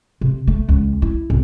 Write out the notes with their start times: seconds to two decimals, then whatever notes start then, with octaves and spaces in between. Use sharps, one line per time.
0.21 C3
0.47 A3
0.69 C#2
1.02 E4
1.30 C2